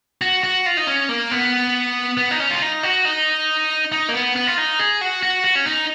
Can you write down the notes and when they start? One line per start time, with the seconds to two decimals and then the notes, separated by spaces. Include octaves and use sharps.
0.22 F#4
0.44 F#4
0.66 F4
0.77 D#4
0.87 C#4
1.09 A#3
1.31 B3
2.17 B3
2.31 D#4
2.40 C#4
2.50 F4
2.62 D#4
2.83 F#4
3.05 D#4
3.92 D#4
4.09 A#3
4.13 B3
4.36 B3
4.47 F4
4.58 D#4
4.79 G#4
5.01 F#4
5.23 F#4
5.44 F#4
5.55 C#4
5.66 D#4